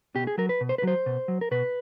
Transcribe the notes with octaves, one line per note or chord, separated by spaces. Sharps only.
B2 G4
G#4
F#3 A#4
B4
B2
C5
B4
F#3 C5
B2
F#3
A#4
B2 B4